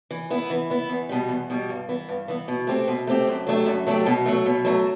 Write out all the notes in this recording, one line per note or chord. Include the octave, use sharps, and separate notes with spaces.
E3
B3 E4
E3
B3 E4
E2
B2 G3
E2
B2 G3
G2
E3 B3
G2
E3 B3
B2
A3 C4 G4
B2
A3 C4 G4
F#2
F#3 A3 D4 G4
F#2
F#3 A3 D4 G4
B2
F#3 A3
B2
F#3 A3